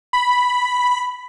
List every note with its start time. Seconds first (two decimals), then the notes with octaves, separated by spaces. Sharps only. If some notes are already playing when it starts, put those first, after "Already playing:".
0.13 B5